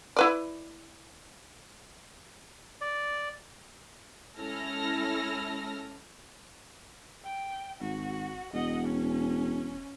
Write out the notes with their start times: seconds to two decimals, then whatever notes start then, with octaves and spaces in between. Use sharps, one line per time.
0.16 E4 B4 D5
2.81 D5
4.37 G#3 C#4 E4 A4 F6 A#6
7.23 G5
7.81 G#1 F#4
8.54 E1 D#5 F#5
8.84 C#4